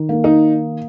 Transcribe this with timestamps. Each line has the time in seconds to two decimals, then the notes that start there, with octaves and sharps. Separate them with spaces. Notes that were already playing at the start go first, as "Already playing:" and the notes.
Already playing: D#3
0.09 A#3
0.24 D#4